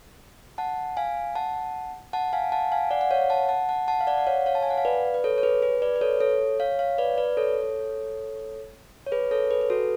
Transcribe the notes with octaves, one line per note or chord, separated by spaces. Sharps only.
F#5 A5
F5 G#5
F#5 A5
F#5 A5
F5 G#5
F#5 A5
F5 G#5
D5 F#5
F#5
C#5 F5
F#5 A5
F#5 A5
F#5 A5
F#5 A5
F5
D5 F#5
F#5
C#5 F5
C#5 F5
A5
G#5
F#5
F5
B4 D5
B4
A4 C#5
C#5
G#4 B4
G#4 B4
B4 D5
B4
A4 C#5
A4 C#5
C#5 F5
C#5 F5
B4 D5
B4 D5
A4 C#5
C#5
G#4 B4
A4 C#5
G#4 B4
B4
F#4 A4